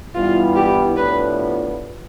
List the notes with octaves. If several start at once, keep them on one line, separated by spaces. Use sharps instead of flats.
G2 E3 G3 B3 E4 F4
G4
A2 F3 B3 D4 F4 B4